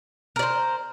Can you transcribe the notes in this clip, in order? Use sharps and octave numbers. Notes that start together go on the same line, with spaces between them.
A#4 C5 D5